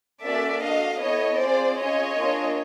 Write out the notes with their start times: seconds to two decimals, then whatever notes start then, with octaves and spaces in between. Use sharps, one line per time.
0.23 A#3 C#4 F#4 A4 D5 E5
0.62 D4 F#4 A4 D#5 F5
1.01 B3 E4 A4 C#5 D#5
1.40 C4 F4 G#4 C5 D5
1.78 C#4 F4 G#4 C#5 D#5
2.17 A#3 D4 F4 G#4